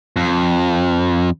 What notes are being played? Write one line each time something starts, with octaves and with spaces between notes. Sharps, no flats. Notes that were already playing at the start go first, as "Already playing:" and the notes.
F2